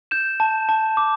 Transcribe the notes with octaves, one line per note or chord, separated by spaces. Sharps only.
G6 E7
A5
A5
D6